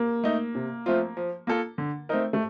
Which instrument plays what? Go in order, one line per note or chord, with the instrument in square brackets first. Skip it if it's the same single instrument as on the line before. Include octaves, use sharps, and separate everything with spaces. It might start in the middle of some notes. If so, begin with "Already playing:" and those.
Already playing: [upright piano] A#3
[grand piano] A3 D#4
C3
F3 A3 C4 F4
F3
A#3 F4 A4
D3
A3 C4 D#4 A#4
[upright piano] A3